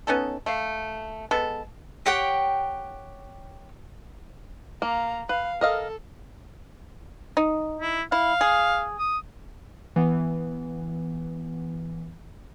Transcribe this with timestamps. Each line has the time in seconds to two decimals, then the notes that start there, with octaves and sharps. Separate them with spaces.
0.07 B3 C#4 D#4 A4
0.46 A3 F5
1.31 G#3 B3 A4
2.06 G4 C#5 F#5 G5
4.82 A#3 F5 A#5
5.29 B4 F5
5.61 A4 A#4 D#5 F5
7.37 D#4
7.79 E4
8.12 E4 F5
8.41 G#4
8.99 D#6
9.96 E3 B3